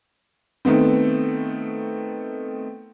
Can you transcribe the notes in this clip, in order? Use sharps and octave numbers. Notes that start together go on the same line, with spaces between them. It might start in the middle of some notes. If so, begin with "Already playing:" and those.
D#3 A3 B3 C4